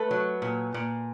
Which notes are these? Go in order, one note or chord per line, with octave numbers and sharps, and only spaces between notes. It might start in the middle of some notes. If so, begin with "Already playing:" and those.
Already playing: A3 A4 B4
F#3
A#2
A#2